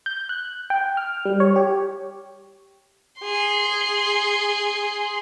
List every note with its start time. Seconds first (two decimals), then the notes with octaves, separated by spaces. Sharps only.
0.06 G6
0.29 F#6
0.70 G5
0.97 F6
1.25 G3
1.40 C#5
1.56 G4
3.21 G#4 C6